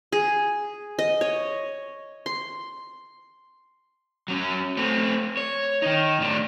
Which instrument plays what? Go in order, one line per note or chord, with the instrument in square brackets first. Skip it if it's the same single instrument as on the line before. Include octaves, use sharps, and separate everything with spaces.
[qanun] G#4
D#5
C#5
C6
[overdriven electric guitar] F#3 C#4
A3 C4
C#5
D#3 D#4
A2 D4